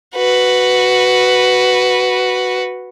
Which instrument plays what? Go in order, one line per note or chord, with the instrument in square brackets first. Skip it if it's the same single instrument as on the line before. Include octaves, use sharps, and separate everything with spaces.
[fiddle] F#4 B4